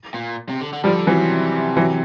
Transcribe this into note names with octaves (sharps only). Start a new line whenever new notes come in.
A#2
C3
D3
D3
D3 F3 G3
C3 E3 F#3
E3 F#3